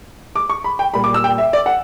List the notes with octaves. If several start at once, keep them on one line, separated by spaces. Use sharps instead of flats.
D6
C#6
B5
G5
A#2 G3 B5
D6
E6
G5
E5
D5
F#5